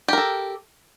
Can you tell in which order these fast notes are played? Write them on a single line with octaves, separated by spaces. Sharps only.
G4 A#4 A4